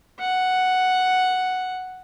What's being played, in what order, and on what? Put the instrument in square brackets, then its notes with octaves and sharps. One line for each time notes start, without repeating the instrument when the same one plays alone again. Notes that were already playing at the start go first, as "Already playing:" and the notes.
[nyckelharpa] F#5